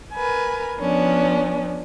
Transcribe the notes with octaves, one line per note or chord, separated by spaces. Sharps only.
A#4 B4 G#5
F3 B3 C#4 D4